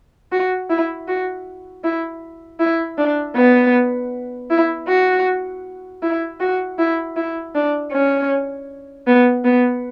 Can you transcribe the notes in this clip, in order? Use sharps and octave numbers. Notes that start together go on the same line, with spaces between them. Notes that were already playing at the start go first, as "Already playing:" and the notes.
F#4
E4
F#4
E4
E4
D4
B3
E4
F#4
E4
F#4
E4
E4
D4
C#4
B3
B3